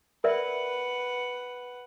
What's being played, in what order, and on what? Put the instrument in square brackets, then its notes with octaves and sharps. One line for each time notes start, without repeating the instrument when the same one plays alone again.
[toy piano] A#4 D5 E5 [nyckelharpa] B4 F#5